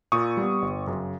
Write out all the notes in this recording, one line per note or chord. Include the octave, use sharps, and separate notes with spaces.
A#2 C#6 D#6
G3 B3
G1
F#2 C#3